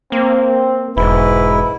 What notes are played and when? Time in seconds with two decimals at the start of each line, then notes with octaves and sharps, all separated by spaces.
0.12 A#3 C4
0.97 E1 G#2 E4 B4